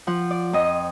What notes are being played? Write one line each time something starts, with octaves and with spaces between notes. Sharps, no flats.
F3 F#5
D5
F2 D#5